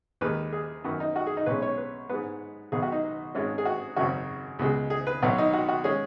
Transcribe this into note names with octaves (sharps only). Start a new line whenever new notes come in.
D#2 D#3 G#3 B4
G#4
F#2 D#3 B3 F#4
D#4
F#4
G#4
D#4
B1 B2 G#3 C#4 B4
C#5
B4
G#2 G#3 B3 B4
B1 B2 B3 G#4
F#4
D#4
G#1 G#2 G#3 C#4
G#4
F#4
G#1 F#2 C#3 F#4
C#2 B2 G#3
G#4
B4
B1 B2 F#3 B3 F#4
D#4
F#4
F#4
G#3 C#4 G#4